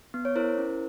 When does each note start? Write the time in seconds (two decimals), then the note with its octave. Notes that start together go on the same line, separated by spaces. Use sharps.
0.14 B3
0.25 C#5
0.35 E4 A#4 C5
0.58 C#4